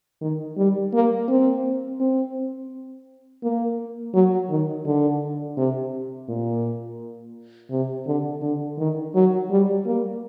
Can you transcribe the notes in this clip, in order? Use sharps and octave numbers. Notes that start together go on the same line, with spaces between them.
D#3
G3
A#3
C4
C4
A#3
F#3
D#3
D3
C3
A#2
C3
D3
D3
D#3
F#3
G3
A#3